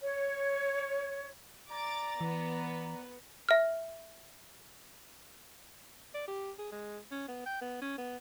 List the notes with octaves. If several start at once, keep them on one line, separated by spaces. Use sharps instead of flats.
C#5
D5 A#5 D6 A6
E3 B3
E5 F6
D5
G4
G#4
G#3
C#4
B3
G5
B3
C#4
B3